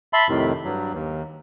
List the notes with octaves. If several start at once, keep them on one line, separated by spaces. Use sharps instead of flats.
E5 A5 B5 C6
F2 A2 C3 D#3
G2 F#3
D#2